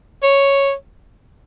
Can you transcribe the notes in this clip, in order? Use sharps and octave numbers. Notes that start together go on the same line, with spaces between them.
C#5